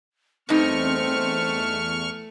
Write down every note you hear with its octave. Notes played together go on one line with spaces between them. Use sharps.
E2 G2 A3 C4 D#4 C#6 F6